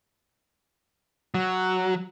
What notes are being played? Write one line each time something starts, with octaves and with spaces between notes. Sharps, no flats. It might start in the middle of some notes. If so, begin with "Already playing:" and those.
F#3 F#4